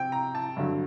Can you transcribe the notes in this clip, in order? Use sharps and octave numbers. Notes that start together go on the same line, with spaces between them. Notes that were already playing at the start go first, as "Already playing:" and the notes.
Already playing: C3 C4 G5
A#5
A5
G2 D3 F#3